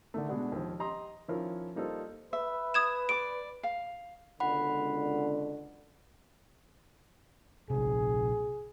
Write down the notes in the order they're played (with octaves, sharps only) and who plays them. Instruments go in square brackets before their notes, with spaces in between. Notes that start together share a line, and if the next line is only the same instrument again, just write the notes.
[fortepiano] D3 D#3 A3
B2 G#3 B3 D4 F#4
D#2 F3
G4 D#5 A#5 C6 D#6
D#3 F3 C#4 E4 F4 A#4
G3 A#3 D#4 F4 A4 C5
[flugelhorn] B4 [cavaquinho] E5
[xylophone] D#6 G#6 E7
[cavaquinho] D5 D6 [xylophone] D7
[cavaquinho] F5
[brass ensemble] C#2 B2 D3 [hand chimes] F#5 B5
[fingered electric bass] A#1 C3 [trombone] G#4